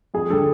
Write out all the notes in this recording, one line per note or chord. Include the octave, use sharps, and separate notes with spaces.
F2 G#4
D3 G3 A4